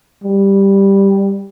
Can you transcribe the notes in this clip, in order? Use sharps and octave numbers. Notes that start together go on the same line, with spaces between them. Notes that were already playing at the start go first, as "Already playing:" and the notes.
G3